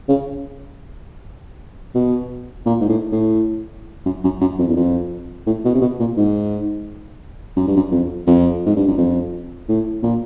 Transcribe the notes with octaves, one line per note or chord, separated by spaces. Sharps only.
C#3
B2
A#2
G#2
A2
A2
F#2
F#2
F#2
F2
E2
F2
A2
B2
C3
B2
A#2
G#2
F#2
G2
F#2
F2
F2
G#2
G2
F#2
F2
A2
A#2